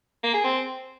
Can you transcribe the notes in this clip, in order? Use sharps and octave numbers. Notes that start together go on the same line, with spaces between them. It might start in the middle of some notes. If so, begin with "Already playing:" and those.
A#3
G#4
C4